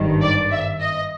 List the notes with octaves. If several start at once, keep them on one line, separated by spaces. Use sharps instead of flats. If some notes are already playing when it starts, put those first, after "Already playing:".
Already playing: G#1 G2 D#3
D5
E5
D#5